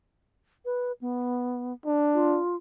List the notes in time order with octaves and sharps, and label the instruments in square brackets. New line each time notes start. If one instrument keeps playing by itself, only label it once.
[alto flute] B4
B3
[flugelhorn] D4
[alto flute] F4